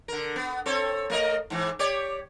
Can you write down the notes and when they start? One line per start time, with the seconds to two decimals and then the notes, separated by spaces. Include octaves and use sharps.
0.08 D3 A#4
0.36 B3
0.66 C4 A4 C#5
1.10 A3 A#4 D#5
1.50 G#2 E3
1.79 G4 C#5 D5